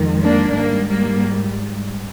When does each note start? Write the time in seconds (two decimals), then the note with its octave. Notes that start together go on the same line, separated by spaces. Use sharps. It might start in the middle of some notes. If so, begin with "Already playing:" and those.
Already playing: F2 D#3 G#3
0.22 A#3 D4
0.55 G#2 G3 A#3
0.88 A#3